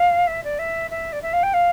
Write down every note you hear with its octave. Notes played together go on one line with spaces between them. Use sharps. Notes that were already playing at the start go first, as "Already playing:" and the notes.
Already playing: F5
E5
D5
E5
E5
D5
E5
F5
G5
F5